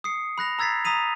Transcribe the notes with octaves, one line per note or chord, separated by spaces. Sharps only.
D#6 C7 C#7
B5 F#6 A#6 F7
A#5 E6 G#6 A6 B6 C7
A#5 D#6 B6 D#7 F7